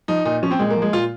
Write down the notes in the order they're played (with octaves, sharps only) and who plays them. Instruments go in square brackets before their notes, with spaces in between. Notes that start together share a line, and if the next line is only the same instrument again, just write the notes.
[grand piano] F3 D#4
A#2 D#4
F3 C#4
C4
A#2 G#3
A#3
F3
G#3
A#2 F4